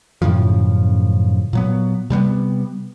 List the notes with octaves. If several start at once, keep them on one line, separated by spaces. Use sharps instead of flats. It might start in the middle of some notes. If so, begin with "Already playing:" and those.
F#2 A2 C#3 F3
A#2 F#3 B3
C3 G3 A#3 B3